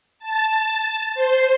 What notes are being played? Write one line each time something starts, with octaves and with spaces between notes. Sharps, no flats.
A5
C5